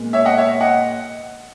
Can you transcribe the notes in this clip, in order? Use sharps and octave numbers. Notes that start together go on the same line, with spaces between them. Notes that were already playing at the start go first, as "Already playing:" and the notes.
Already playing: A#2 G#3 B3
C#5 E5
D#5 F#5
C#5 E5
D#5 F#5